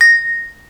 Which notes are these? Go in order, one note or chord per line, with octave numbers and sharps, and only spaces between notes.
A#6